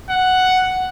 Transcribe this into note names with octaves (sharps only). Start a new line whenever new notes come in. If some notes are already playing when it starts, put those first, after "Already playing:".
F#5